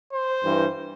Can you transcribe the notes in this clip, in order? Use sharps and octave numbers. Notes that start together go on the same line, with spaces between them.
C5
G2 E3